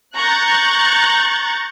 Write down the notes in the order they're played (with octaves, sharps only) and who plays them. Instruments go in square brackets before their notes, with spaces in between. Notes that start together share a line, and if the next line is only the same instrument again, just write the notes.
[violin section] A#5 C#6 F#6 G6 A6